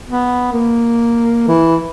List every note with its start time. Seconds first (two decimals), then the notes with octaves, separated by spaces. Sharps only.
0.09 B3
0.52 A#3
1.47 E3